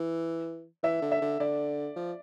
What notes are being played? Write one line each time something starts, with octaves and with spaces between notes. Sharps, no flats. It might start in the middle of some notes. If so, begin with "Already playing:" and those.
Already playing: E3
E3 E5
D3
E5
D3
D3 D5
F3